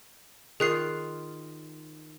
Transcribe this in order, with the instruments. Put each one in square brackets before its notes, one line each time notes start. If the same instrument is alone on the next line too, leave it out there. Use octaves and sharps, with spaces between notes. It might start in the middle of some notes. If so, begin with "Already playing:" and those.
[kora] D#3 F4 [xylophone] G#4 F#6 C7